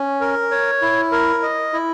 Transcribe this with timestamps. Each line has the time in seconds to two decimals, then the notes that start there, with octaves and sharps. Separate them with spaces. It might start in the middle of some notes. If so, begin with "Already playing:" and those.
Already playing: C#4
0.21 A#4
0.51 C#5
0.82 E4
1.12 A#4
1.43 D#5
1.73 E4